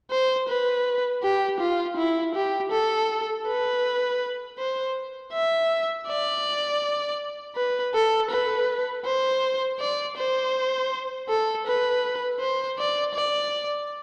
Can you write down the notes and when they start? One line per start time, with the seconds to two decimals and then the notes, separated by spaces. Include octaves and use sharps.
0.11 C5
0.48 B4
1.23 G4
1.60 F4
1.97 E4
2.35 G4
2.72 A4
3.47 B4
4.58 C5
5.33 E5
6.08 D5
7.56 B4
7.94 A4
8.31 B4
9.05 C5
9.80 D5
10.17 C5
11.29 A4
11.67 B4
12.40 C5
12.78 D5
13.15 D5